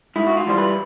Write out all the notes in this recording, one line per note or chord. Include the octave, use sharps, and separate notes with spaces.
G#2 E4
F#4
F4
E3 G3 C5
B4